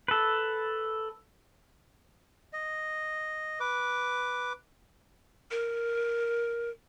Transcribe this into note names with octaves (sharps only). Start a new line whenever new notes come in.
A4 B4
D#5
B4 D6
A#4